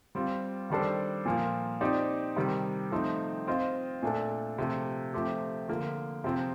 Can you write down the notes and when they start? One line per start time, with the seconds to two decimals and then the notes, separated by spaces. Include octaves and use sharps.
0.15 G3 C4 F4
0.70 D#3 G3 D4 A4 C5
1.26 A#2 F3 A#3
1.81 C4 D#4 G4 D5
2.36 C3 D#3 G3
2.92 F3 A3 C4 D#4
3.47 C4 F4 C5 D#5
4.03 A#2 A3 D4 A4
4.58 C3 F3 A3
5.14 F3 A3 C4 G4
5.69 D3 F3 A#3
6.24 C3 F3 C4